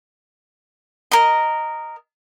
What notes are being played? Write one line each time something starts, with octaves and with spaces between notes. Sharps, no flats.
A#4 D#5